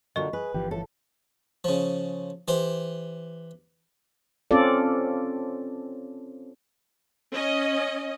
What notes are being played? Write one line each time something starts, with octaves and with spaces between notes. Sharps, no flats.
A#2 D3 F#3 D#5 C#6
G#4 B4
G1 E3 F3 G4
A2 A4
C#3 F3
E3 G4 C5
C4 C#4 F4 A4 D5
C#4 D#5